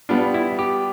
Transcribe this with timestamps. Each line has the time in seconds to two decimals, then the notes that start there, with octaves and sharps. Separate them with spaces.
0.09 G3 B3 D4 F4
0.34 E4
0.59 G4